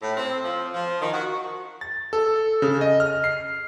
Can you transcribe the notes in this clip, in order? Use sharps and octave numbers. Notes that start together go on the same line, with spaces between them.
A2
C4
F3
F3
D#3
F#4
A6
A4
C#3
D#5
F6
C7